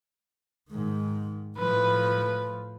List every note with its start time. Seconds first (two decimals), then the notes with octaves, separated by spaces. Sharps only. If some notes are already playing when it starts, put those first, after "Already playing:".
0.70 G#2 D#3
1.57 A2 F3 B4